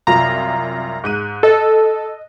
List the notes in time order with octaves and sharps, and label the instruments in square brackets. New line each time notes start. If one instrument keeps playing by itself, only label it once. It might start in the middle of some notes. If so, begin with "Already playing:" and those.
[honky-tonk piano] C2 F#2 F4 [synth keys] A#5
[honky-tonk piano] G#2 F#6 D#7
[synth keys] A4 [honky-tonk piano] D#5